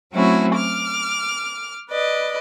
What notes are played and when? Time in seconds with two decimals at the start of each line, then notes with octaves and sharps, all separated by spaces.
0.12 F#3 A3 C4 C#4 E4 F#4
0.55 D6 F6
1.90 B4 D5 D#5